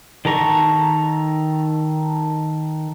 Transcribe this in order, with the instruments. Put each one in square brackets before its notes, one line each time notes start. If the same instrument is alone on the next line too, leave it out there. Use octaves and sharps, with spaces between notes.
[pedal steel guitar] D#3 A4 A#5 C#6